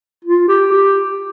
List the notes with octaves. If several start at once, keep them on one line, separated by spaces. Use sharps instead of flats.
F4
G4
G4